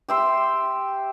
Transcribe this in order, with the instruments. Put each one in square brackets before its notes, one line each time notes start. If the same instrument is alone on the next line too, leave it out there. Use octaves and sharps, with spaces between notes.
[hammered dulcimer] G4 E5 C6